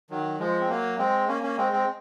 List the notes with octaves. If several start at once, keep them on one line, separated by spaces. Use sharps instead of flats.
D#3 F#3
F3 G#3
C4
F#3 A#3
G#3 C4
A#3 C#4
A#3 C#4
G#3 C4
G#3 C4